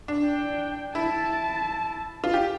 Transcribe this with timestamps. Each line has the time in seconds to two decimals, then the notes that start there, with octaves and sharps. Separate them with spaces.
0.08 D4
0.26 G5
0.95 E4 A5
2.24 F4
2.34 G4